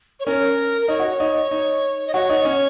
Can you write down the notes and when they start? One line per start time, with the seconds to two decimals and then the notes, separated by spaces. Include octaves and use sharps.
0.20 C#5
0.26 C#4 A#4
0.81 A#4
0.88 D#4 C#5
0.99 F#4
1.20 D#4
1.51 D#4
2.07 D#5
2.14 F#4 C#5
2.29 D#4
2.45 C#4